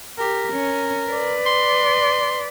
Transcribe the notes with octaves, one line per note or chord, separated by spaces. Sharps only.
G4 A#4
C#4
B4 D5
C6